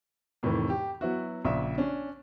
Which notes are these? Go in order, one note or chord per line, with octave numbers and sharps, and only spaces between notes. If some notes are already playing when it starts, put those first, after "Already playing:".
F2 A2 C3 D#3 E3
G4
F#3 B3 E4 F#4
A#1 C#3 E5
C#4 D4